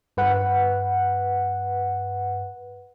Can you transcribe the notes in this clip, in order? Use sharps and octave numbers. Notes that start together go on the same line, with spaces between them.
G2 B4 F#5